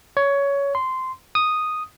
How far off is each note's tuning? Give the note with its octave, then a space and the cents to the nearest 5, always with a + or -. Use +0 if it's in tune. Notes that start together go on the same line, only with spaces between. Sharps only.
C#5 +15
C6 -15
D#6 -5